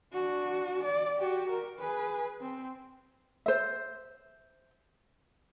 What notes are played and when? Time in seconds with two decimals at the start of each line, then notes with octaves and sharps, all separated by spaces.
0.13 D4 F#4
0.84 D5
1.17 F#4 G4
1.50 A#4
1.80 G#4 B4
2.41 C4
3.46 C5 E5